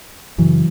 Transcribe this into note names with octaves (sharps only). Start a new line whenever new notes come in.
F#2 C#3 E3 F#3